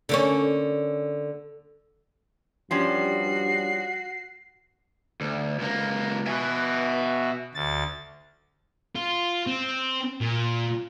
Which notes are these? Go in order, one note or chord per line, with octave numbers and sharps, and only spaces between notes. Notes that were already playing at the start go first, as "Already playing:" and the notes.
D3 A#3 C#4
G2 F3 G3 C#4 F#4 C7
D2
C#2 A#3
B2 F#4 E5 G#5
D2 A6
F4
C4
A#2